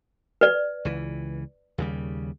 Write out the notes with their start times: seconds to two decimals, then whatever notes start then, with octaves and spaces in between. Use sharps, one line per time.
0.41 B4 D5
0.85 C#2 E3
1.78 D#2 C#3 G3